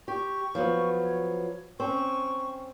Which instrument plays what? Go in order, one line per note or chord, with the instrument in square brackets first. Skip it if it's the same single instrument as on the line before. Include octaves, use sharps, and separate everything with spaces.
[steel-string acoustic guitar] G4 [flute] C#6
[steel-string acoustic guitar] F3 F#3 B3
[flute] C#5
[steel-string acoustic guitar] C4 C#4 [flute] C#6